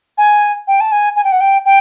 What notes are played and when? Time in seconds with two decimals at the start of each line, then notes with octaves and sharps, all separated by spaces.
0.18 G#5
0.68 G5
0.81 A5
0.92 G#5
1.16 G#5
1.24 G5
1.32 F#5
1.41 G5
1.65 G5